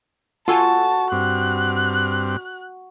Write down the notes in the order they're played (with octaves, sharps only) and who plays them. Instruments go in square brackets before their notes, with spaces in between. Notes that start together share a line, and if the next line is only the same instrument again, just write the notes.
[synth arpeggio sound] F4 A4 G#5 [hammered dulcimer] F#4 [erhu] A5
[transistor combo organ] G2 C4 [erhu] F#6